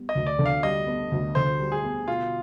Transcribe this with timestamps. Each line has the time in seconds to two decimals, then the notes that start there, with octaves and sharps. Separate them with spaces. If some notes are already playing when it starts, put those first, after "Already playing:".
Already playing: G3 B3
0.09 D#5
0.15 D2
0.27 D5
0.39 D3
0.46 F5
0.63 G3 D#5
0.87 B3
1.12 D2
1.35 D3 C5
1.59 G3
1.72 G#4
1.84 B3
2.07 B2 F4